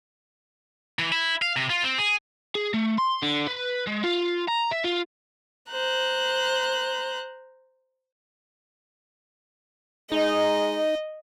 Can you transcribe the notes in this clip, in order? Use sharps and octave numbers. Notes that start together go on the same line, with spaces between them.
E3
E4
F5
C3
F4
C4
G#4
G#4
A3
C6
D3
B4
G#3
F4
A#5
E5
F4
C5 A#5 F#6
G#3 D#4 D#5